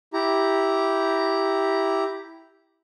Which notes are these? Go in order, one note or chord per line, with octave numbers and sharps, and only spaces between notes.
E4 G4 A#5